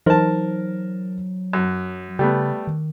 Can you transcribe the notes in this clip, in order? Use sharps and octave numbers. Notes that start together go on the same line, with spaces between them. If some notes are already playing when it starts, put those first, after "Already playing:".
E3 F#3 D#4 A#4 C5 A5
F#2
C#3 G3 A3 B3
D#3